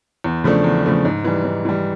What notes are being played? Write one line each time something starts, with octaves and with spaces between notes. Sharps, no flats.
E2
C#3 F3 A3 D4
E2
C#3 F3 A3 D4
G#2
E3 G3
G#2
E3 G3